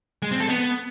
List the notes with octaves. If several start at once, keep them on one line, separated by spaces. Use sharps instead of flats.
G#3
C4
A4
B3